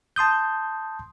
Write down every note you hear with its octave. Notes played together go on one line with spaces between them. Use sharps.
A5 C6 D#6 G6